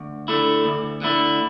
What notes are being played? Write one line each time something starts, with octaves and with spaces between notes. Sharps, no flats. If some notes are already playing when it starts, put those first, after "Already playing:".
Already playing: D2
D3 A3 E4
D2
D3 A3 E4